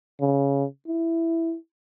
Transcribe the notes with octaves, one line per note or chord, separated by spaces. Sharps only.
C#3
E4